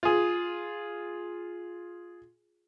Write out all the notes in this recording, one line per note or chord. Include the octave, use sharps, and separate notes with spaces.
F4 G#4